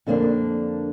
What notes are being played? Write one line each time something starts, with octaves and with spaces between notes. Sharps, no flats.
F2 D3 A#3 D4